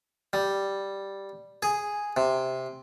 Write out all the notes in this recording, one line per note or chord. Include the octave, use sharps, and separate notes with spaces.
G3
G#4
C3